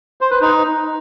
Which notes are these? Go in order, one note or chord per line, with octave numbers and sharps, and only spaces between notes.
C5
B4
D#4